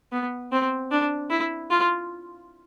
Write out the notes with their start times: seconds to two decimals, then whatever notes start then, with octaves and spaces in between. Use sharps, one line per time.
0.12 B3
0.52 C4
0.91 D4
1.30 E4
1.71 F4